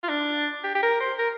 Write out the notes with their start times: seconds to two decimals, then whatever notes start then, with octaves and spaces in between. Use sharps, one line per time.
0.03 F4
0.09 D4
0.64 G4
0.75 G4
0.82 A#4
1.00 C5
1.19 A#4